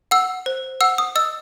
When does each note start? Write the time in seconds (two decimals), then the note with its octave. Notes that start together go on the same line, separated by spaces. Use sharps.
0.11 F#5 E6
0.46 C5
0.81 F#5 E6
0.98 D#6
1.16 D#5 E6